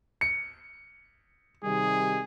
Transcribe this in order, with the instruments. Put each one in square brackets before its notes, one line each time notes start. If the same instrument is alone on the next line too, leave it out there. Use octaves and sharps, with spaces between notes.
[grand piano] C#7
[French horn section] C3 D#3 G3 [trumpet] G#4